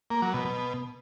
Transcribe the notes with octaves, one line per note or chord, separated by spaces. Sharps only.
A#3
F#3
B2
B2